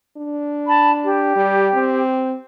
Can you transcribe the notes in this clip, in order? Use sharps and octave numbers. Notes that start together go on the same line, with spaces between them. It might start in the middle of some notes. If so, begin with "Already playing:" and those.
D4
A5 B5
G4
G3
C4